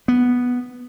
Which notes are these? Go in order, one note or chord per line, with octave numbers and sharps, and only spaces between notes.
B3